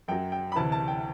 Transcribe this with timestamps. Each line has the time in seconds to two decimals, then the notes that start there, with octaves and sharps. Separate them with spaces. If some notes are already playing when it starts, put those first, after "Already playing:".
0.08 F#2 F#3 G5
0.32 G5
0.52 B5
0.55 D2 C3 E3 A5
0.72 A5
0.88 G5